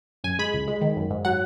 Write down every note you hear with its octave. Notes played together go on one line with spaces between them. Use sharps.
F#2 G#5
G#3 B5
C#2
G#3
D#3
F#2
G#2
F#3 F#5